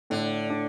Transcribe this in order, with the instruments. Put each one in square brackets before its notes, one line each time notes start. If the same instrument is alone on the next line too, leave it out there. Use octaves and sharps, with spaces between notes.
[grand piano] A2 [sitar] D3
[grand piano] D4